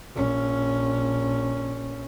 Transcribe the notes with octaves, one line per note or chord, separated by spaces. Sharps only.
A#1 C#4